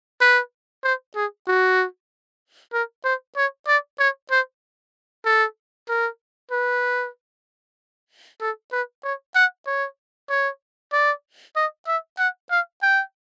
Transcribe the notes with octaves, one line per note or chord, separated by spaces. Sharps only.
B4
C5
G#4
F#4
A#4
C5
C#5
D5
C#5
C5
A4
A#4
B4
A4
B4
C#5
F#5
C#5
C#5
D5
D#5
E5
F#5
F5
G5